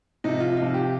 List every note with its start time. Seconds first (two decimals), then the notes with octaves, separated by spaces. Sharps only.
0.24 C3 F3 D#4
0.40 F4
0.57 C3 F3 F4
0.74 G4